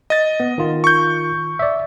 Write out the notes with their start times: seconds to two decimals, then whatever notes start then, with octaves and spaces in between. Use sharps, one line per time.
0.10 D#5 A6
0.40 B3
0.58 D#3 F4
0.84 C#6 G6
1.59 D5 E5